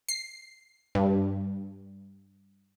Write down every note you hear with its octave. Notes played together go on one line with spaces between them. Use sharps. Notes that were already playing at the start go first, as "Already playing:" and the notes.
C7
G2